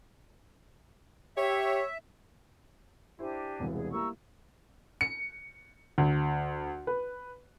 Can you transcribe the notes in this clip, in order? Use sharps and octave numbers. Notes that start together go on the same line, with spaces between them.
G4 C#5 E5
D4 E4 G4 C5 G#5
E1 C2 E3
G#4
G3 A#3 E4 A#5 C#6 E6
C#7
D2
B4